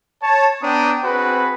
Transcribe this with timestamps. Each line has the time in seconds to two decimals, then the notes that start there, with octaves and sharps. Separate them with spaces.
0.23 C#5 A5
0.62 B3 D4 G5 A#5 D#6
1.04 C4 F#4 G#4 B4